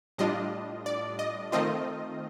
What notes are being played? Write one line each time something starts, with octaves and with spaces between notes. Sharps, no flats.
A2 G3 D4 F4 D#5
D5
D#5
D#3 A3 C4 F4 D#5